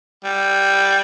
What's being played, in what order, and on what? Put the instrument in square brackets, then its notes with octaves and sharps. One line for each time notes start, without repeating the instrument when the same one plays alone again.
[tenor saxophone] G3